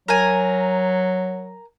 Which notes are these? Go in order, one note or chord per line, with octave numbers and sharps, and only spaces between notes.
F#3 A#4 G#5